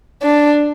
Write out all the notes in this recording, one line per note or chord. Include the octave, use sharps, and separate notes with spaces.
D4